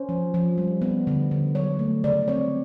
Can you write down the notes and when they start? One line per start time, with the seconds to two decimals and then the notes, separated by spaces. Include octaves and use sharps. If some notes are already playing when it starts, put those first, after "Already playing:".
Already playing: C#4 C5
0.09 F3
0.34 F3
0.58 G3
0.82 B3
1.07 D3
1.31 D3
1.55 F#3 C#5
1.79 A3
2.04 C#3 D5
2.28 C4 C#5